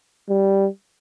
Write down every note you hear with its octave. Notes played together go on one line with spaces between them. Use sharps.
G3